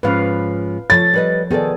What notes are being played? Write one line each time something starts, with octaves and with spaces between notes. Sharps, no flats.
G#2 F3 C#4 B4 F5
F3 A4 C#5 A6
G3 B4 D#5
D#3 B3 G#4 A4 D5